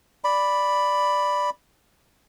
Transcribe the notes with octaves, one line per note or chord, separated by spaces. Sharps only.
D5 B5